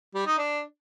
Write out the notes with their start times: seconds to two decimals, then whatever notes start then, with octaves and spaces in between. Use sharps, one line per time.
0.15 G3
0.26 D#4
0.38 D4